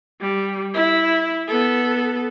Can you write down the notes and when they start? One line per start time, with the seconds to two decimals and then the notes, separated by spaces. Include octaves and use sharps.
0.21 G3
0.73 E4
1.47 B3 A4